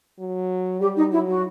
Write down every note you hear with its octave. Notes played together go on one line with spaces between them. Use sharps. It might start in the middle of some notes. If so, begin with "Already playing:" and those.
F#3
G3 G4
D#4
F#3 E4
F#4